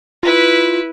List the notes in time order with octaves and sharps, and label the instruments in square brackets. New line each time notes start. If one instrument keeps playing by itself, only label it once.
[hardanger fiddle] E4 B4 [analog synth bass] F4